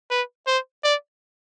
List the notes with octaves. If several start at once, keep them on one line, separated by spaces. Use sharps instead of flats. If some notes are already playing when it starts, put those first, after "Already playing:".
B4
C5
D5